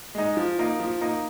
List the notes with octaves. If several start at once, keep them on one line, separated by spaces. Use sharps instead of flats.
G#3 D#4
F3
A#3 D#4
F3
A#3 D#4